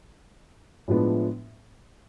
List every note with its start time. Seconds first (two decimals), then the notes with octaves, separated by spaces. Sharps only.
0.88 A2 F3 G#3 B3 D4